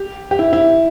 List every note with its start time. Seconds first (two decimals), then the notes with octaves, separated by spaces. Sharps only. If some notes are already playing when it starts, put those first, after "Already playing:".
Already playing: G4
0.31 G4
0.39 E4
0.53 E4